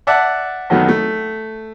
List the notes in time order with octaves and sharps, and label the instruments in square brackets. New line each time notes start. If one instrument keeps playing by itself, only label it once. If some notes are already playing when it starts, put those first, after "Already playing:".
[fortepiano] D5 E5 F#5 A5
F#2 D#3 F#3 A3 B3
A3